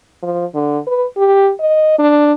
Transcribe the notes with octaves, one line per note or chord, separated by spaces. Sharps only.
F3
D3
B4
G4
D#5
D4